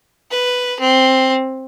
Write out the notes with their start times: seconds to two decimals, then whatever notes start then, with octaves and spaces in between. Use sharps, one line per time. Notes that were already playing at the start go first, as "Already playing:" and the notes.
0.31 B4
0.80 C4